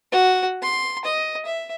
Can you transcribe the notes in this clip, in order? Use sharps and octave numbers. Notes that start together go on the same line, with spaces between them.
F#4
C6
D#5
E5